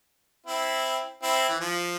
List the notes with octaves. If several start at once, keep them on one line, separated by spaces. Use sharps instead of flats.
C4 E4
C4 E4
E3
F3